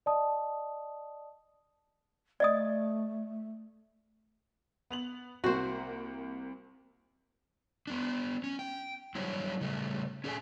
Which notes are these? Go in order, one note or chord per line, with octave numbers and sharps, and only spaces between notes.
D5 D#5 A5 D#6
A3 D5 D#5 D#6
B3 F7 F#7
C2 A#3 F#4 C5
B3 D4
C#4
G5
F#3 G3 D4 E4 C#5
C#3 G3 A3
C#4 G#4 A4 G5 G#5